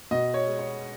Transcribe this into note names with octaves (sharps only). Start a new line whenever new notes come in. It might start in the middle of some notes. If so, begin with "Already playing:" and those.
B2 D#5
C#5
G#3
C#5